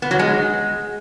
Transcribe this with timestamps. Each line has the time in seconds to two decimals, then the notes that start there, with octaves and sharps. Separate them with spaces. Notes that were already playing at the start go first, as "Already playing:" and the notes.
0.02 B3
0.11 F#3
0.19 G#3